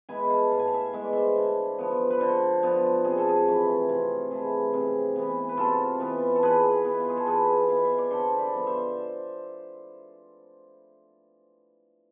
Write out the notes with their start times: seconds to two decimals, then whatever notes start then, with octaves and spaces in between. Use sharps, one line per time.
0.09 G#3 B3 E4 G#5 B5
0.30 F5 A5
0.51 A2 A5
0.59 G#5
0.67 F5
0.74 E5 G#5
0.93 G#3 B3 E4 E5
1.04 D5
1.13 C5 E5
1.36 D3
1.79 F3 B3
2.10 B4
2.20 D3 A4 C5
2.63 F3 B3
3.05 C3 G#4
3.18 A4
3.29 G#4
3.47 E3 A3 E4
3.89 C3 F4
4.31 E3 A3 E4 G#4
4.73 C3 G#4
5.16 E3 B3
5.49 B4
5.57 C3 F4 A4
6.00 E3 B3
6.35 A4
6.43 E3 G#4 B4
6.85 B3 E4
7.00 F4
7.09 G#4
7.17 A4
7.27 E3 G#4 B4
7.69 B3 E4 F5
7.85 E5
7.98 D5
8.11 D3 A4 C5
8.39 B4 D5
8.53 F3 B3
8.67 C5 E5